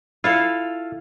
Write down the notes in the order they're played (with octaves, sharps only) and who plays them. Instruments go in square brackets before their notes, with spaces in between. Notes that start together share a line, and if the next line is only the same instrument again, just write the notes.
[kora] E4 F5 [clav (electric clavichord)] F4 A4